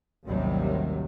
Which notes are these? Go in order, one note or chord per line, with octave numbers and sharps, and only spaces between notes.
A1 D#2 C3 D#3 F#3 G3